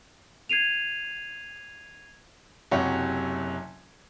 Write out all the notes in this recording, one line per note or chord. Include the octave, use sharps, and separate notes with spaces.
G#6 C7 D#7 F7
F#1 C3 F#3 G4 C#5 F#5